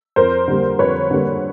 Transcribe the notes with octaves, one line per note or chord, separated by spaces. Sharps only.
F2 A#4 C5
D3 G3 A#3
F2 B4 C#5
D3 G3 A#3